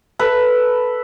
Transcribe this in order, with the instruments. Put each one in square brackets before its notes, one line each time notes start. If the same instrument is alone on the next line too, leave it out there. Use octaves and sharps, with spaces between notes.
[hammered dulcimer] A4 B4